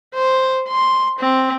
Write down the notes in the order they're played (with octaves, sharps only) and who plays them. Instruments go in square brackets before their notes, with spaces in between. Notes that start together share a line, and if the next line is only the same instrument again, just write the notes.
[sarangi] C5
C6
C4